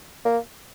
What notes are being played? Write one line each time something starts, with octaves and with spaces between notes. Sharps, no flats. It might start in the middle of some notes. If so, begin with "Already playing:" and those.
A#3